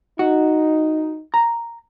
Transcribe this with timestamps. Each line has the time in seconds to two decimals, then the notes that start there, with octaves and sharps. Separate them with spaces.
0.19 D#4 F#4
1.34 A#5